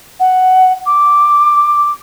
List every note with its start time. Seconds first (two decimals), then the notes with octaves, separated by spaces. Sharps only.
0.20 F#5
0.86 D6